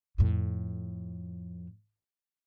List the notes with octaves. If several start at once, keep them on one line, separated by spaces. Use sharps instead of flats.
F2 A2